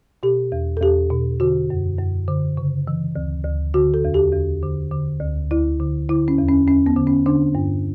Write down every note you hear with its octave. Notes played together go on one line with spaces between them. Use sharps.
B2 G4
E2
A4
E2 G4
B2
D3 F#4
F#2
F#2
D3
C#3
E3
D2
D2
D3 F#4
A4
E2
G4
E2
D3
D3
D2
D2 E4
D3
D3 E4
C#4
E2
C#4
E2 C#4
B3
D3
C#4
D3 D4
G2